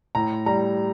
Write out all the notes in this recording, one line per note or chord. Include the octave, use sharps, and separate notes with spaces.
A2 A#5
G3 A#5